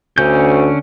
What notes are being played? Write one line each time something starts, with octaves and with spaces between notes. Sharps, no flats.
D2 D3 C#4 G6